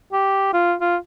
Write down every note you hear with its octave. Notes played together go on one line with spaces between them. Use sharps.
G4
F4
F4